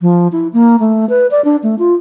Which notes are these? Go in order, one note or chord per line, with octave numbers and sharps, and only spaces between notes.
F3
E4
A#3
A3
B4
D5
D4
A3
F4